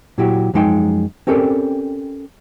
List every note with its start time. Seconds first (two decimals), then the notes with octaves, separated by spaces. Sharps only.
0.18 A#2 F#3 E4 F#4 G4
0.54 F#2 F3 G#3 D#4 G5 C6
1.27 C4 C#4 G4 A4 A#4 D5